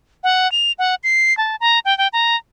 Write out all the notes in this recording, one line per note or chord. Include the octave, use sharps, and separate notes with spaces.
F#5
F7
F#5
C7
A5
A#5
G5
G5
A#5